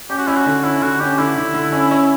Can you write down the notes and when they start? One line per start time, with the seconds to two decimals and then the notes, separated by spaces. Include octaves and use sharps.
0.10 C#4 G4
0.18 F#4
0.27 C#4 E4
0.37 F#4
0.46 D3
0.64 C#4 E4
0.82 D3 F#4
1.00 C#4 G4
1.18 D3 E4
1.36 D3
1.54 D3
1.72 C#4
1.91 C#4